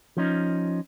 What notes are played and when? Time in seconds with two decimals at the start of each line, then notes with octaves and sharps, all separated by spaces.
0.17 F3 C#4 D#4